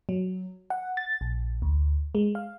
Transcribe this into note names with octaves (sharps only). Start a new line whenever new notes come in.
F#3
F#5
A6
A#1
D2
G#3
F5